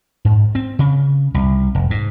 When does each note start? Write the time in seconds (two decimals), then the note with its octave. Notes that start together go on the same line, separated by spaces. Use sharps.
0.25 G#2
0.55 C4
0.79 C#3
1.34 C2
1.75 F1
1.90 G#2